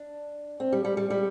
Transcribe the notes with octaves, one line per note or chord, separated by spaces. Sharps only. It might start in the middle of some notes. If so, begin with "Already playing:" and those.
Already playing: D4
C4
G3
G3
G3
G3